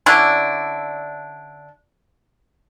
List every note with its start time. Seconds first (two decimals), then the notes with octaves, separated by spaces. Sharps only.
0.06 D3 C#4 D4 E4